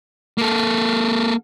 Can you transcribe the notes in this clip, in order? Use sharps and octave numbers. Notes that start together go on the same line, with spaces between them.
A#3 A4